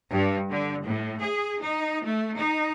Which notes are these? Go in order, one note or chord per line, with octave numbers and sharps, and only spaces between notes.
G2
D3
A2
G#4
D#4
A3
D#4